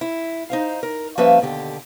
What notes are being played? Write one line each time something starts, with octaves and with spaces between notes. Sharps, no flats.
E4
D#4 C5 F5
A#4
F3 G3 A#3 C#4 B4 E5
D#2 B2 D3 G4